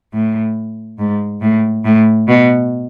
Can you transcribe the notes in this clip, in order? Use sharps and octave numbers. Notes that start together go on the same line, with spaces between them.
A2
G#2
A2
A2
B2